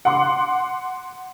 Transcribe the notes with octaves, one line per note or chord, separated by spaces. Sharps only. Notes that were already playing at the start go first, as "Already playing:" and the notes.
F#5 C6 D6